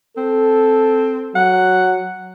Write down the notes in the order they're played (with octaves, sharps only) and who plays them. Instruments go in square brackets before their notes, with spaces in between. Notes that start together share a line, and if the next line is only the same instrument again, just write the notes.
[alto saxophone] C4 [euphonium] A4
[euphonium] F#3 [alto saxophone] F#5